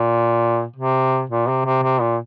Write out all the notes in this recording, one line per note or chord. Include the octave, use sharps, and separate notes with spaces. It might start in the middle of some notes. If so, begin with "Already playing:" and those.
Already playing: A#2
C3
A#2
C3
C3
C3
A#2